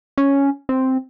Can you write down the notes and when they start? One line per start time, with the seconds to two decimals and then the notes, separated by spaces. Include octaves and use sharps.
0.18 C#4
0.69 C4